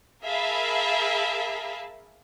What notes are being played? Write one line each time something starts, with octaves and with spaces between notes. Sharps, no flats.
G#4 A#4 E5 F5 A5 B5